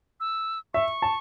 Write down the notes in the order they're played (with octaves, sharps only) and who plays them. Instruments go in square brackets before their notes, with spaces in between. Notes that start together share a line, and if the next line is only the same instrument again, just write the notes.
[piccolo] E6
[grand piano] E5 [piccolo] C#6
[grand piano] A5